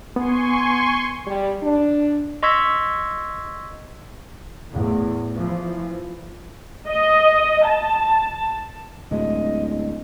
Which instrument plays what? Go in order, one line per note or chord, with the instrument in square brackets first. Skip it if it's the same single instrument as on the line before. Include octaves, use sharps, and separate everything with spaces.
[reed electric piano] B3 [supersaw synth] G#5 C6 C#6
[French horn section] G3
D4
[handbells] D#5 C6 C#6 E6 G#6 B6
[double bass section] E2 A2
E3 F3
[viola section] D#5
A5
[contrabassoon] D1 [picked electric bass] D2 A2 G#3 [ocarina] D#5